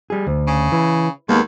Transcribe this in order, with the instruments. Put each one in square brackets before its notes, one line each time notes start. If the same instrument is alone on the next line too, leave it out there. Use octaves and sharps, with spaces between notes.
[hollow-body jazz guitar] G3 G#4
D2
[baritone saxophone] C#3
[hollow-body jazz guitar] E3
[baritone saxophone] D#2 [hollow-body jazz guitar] G#3 A#3 B3